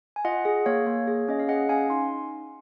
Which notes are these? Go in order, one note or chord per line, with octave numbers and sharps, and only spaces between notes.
G#5
F4 D#5 F#5
G#4
A#3 C#5 F5
A#3
G#4
C#4 D#5
F5
G#4 D#5 F#5
C#4 F5 G#5
D#4 C6